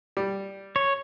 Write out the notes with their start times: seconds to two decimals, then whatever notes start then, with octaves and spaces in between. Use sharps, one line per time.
0.17 G3
0.76 C#5